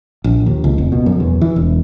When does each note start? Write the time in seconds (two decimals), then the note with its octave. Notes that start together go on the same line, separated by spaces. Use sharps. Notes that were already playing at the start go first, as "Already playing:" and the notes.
0.24 A#1
0.46 D#2
0.64 C#2
0.78 F1
0.92 B2
1.06 F#2
1.20 E2
1.42 E3
1.56 E1